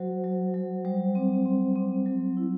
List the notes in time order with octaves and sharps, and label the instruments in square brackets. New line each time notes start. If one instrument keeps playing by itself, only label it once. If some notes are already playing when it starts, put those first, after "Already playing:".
Already playing: [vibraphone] F#3 F#4 C5
F#3
F#3
G3 C5
C4
C4
C4
F#3
E4